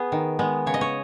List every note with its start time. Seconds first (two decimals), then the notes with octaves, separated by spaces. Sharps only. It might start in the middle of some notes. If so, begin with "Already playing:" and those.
Already playing: B3 G#4
0.12 D#3
0.39 G#3 B3
0.67 C#3 C#5
0.74 D#5
0.81 C#5